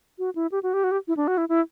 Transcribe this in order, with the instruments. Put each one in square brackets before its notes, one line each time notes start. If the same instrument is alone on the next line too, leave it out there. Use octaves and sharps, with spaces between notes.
[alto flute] F#4
E4
G4
F#4
G4
F#4
G4
E4
D4
F#4
E4
E4